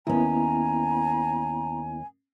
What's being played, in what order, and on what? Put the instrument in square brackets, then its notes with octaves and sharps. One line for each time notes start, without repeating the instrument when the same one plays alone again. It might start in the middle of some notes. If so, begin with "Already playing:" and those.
[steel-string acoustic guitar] D#2 C#4 [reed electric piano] B3 E4 [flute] G#5 [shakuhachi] A#5